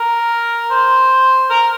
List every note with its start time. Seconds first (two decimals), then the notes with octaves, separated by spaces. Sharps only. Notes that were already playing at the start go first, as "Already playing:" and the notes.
Already playing: A#4
0.70 C5
1.50 A#4